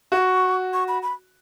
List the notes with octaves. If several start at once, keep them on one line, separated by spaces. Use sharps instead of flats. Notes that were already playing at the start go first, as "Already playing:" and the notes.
F#4 C#6
C#6
B5
B5